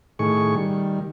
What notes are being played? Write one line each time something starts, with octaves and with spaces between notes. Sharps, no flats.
A2 D#3 G#4 C#6
D#3 G3